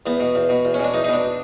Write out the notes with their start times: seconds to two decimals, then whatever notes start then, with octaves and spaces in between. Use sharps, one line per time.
0.06 E2 B3
0.20 B2
0.35 E2
0.49 B2
0.65 E2
0.74 C#4
0.79 B2 D4
0.93 E2 D#4
1.04 B2 D#4
1.14 D4